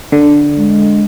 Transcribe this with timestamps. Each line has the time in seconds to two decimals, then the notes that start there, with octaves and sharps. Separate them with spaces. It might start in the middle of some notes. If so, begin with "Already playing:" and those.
0.12 D3
0.57 G#3